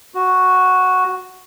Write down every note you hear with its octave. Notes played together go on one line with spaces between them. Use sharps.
F#4